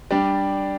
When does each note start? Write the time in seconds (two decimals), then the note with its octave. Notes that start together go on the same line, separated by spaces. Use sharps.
0.11 G3 D4 G4 D5